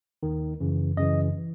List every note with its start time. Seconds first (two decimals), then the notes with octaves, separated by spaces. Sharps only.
0.23 D#2 D#3
0.60 F#2 C#3 E3
0.97 F#2 C#3 E3 D#5
1.38 E3